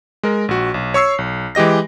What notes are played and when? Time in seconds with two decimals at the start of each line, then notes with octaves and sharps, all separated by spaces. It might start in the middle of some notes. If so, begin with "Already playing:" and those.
0.23 G#3 A#4
0.48 A#1 F#4
0.74 B1
0.94 C#5 C#6 E6 C7
1.18 B1
1.55 E3 G#3 G4 D#5 A#6